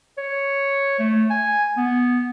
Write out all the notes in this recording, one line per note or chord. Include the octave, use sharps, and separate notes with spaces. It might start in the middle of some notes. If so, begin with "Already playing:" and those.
C#5
A3
G#5
B3